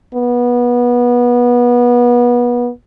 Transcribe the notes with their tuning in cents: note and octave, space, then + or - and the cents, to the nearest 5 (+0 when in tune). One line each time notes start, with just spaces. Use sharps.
B3 -25